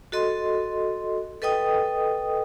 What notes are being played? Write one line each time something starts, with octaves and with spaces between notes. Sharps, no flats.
F#4 A4 D#5 C6
A4 B4 D#5 G5 D#6